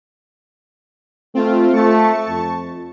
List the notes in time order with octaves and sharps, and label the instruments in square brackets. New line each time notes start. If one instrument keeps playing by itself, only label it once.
[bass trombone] A3 [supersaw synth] C4 F4
[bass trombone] A3 [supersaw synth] A5 C#6
[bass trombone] F2